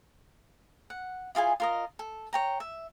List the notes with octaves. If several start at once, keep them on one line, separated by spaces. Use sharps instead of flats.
F#5
E4 F4 G#4 G#5
F4 A#4 D#5
A4
C#5 G5 A#5
E5